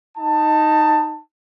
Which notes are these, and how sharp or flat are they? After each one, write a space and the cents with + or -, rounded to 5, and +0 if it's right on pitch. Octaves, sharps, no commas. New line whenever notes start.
D#4 +0 A5 +20